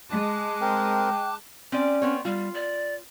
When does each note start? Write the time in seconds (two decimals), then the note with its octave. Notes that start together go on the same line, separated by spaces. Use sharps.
0.10 G#3 A5 D6 F#6
0.61 C4 A#4 G5
1.72 C4 C#4 D5
2.02 B3 C4 C#5
2.25 G3 F4
2.54 D5